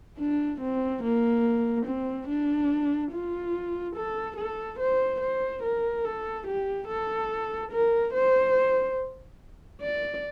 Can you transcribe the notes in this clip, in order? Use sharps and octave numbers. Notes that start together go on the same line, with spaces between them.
D4
C4
A#3
C4
D4
F4
A4
A4
C5
C5
A#4
A4
G4
A4
A#4
C5
D5